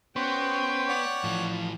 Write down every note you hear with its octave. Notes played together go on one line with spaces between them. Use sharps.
B3 C#4 F#4 C5 G5
C#5 D5 F#5
A2 E3 F3